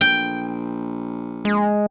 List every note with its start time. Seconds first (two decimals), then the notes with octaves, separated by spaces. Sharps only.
0.01 A#1 G5
1.45 G#3